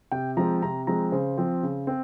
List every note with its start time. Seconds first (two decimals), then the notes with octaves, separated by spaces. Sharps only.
0.12 C3 G5
0.37 F3 G#3 C4 A#5
0.62 C3 A#5
0.87 F3 G#3 C4 A#5
1.12 C#3 C5
1.38 F3 C4
1.63 C#3
1.87 C4